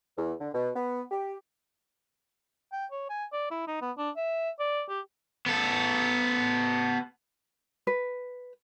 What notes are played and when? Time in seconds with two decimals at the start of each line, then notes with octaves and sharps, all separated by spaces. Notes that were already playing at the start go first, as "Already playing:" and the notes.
0.17 E2
0.40 D3
0.54 B2
0.75 B3
1.11 G4
2.72 G5
2.91 C#5
3.09 G#5
3.32 D5
3.51 E4
3.67 D#4
3.81 B3
3.98 D4
4.16 E5
4.59 D5
4.89 G4
5.46 B3 A4
7.87 B4